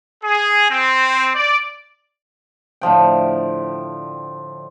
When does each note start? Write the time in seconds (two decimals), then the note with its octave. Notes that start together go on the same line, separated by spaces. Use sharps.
0.24 G#4
0.70 C4
1.35 D5
2.81 A2 D3 F3 G5